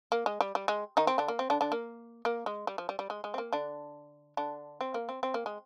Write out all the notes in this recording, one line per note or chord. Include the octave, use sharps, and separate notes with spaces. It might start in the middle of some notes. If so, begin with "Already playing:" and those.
A#3
G#3
G3
G3
G#3
D#3 D#4
C4
D3 D4
A#3
C4
D3 D4
D3 D4
A#3
A#3
G#3
G3
F3
G3
G3
G#3
G#3
C4
A#3
D3 D4
D3 D4
C4
A#3
C4
C4
A#3
G#3